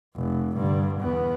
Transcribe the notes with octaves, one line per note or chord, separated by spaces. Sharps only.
F1
G2 D3
E2 B3